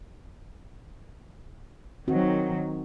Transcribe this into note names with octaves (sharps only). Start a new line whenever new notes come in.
D#3 F#3 C4 F#4